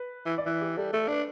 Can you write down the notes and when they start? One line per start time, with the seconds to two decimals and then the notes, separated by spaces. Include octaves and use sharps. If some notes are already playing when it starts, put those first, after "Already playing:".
Already playing: B4
0.26 E3
0.38 D5
0.46 E3 B4
0.61 G4
0.77 G3 A4
0.93 A3 A4
1.08 D4 B4